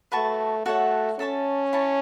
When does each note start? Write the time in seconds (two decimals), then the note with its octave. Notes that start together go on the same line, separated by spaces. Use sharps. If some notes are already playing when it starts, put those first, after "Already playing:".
0.12 A3 F#4 B4 A5 C#6
0.66 A3 F#4 A4 C#5 F#5
1.19 C#4 A4 E5 A5 C#6
1.73 E4 C#5 A5